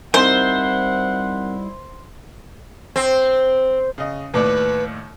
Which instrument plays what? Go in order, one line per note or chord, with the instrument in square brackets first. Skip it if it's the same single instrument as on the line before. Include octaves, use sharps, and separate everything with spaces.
[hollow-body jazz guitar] G3 D#4 E4 [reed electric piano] C4 A#4 [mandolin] C5 [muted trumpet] F#5
[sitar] C4
[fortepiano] C#3 D#5
[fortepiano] D#2 A2 D5 [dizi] B4